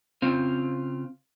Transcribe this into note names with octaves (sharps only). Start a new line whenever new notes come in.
C#3 C4 F4 F5